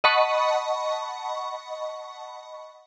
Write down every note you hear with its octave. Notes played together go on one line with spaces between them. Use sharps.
D#5 F#5 A5 B5 C#6